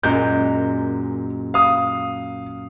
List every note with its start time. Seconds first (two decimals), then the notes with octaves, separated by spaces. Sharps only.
0.03 F#2 A#2 G#3 G6
1.54 F5 D#6